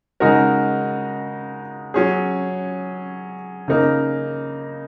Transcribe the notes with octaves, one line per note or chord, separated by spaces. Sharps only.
C#3 G#3 D#4 F#4 A#4
F#3 C#4 G#4
C#3 A#3 D#4 A#4